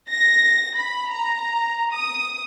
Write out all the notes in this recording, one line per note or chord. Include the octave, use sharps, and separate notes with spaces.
A#6
B5
A#5
D#6